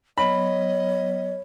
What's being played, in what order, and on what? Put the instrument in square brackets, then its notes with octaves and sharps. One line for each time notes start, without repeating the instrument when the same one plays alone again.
[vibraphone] F#3 B3 [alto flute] C#5 [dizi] D#5 [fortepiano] B5